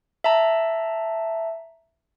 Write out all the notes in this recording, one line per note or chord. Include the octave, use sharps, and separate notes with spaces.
E5 A5 A#5